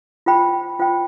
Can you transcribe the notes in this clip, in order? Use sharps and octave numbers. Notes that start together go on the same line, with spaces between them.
F4 C5 G5 B5
F4 C5 G5 B5